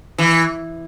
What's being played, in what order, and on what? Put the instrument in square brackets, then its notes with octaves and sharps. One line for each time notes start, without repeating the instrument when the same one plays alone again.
[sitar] E3